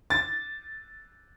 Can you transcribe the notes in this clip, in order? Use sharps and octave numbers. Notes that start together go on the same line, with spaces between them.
A6